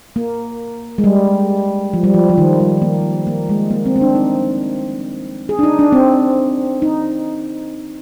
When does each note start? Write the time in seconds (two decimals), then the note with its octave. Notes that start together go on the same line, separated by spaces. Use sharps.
0.16 A#3
0.98 G#3
1.04 G3
1.94 F3
2.04 G3
2.14 F3
2.29 F3
2.38 D#3
2.60 G3
2.82 A#3
3.27 A#3
3.49 G#3
3.71 A#3
3.86 C4
3.96 C4
4.01 D4
4.16 D#4
5.49 G#4
5.59 D4
5.63 D#4
5.79 D4
5.93 C4
6.82 D#4